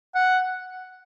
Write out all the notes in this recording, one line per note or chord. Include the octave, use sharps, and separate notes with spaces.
F#5